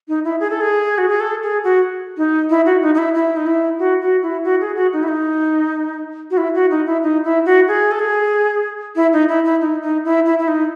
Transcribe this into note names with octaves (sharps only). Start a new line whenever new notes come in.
D#4
E4
G#4
A4
G#4
F#4
G#4
A4
G#4
F#4
D#4
E4
F#4
D#4
D#4
E4
E4
D#4
E4
F#4
F#4
E4
F#4
G#4
F#4
D#4
E4
D#4
F#4
E4
F#4
D#4
E4
D#4
E4
F#4
G#4
A4
G#4
E4
D#4
E4
E4
D#4
D#4
E4
E4
E4
D#4